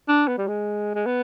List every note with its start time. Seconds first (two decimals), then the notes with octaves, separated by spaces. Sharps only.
0.08 D4
0.28 B3
0.38 G3
0.48 G#3
0.95 G#3
1.06 B3